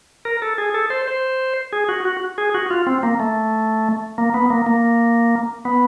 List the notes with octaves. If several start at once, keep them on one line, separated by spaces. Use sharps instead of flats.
A#4
A4
G#4
A4
C5
C5
G#4
F#4
F#4
G#4
F#4
F4
C4
A#3
A3
A#3
B3
A#3
A#3
B3